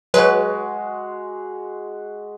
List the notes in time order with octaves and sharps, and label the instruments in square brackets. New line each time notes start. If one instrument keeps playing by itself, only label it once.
[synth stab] F#3 B4 [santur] G#3 F#4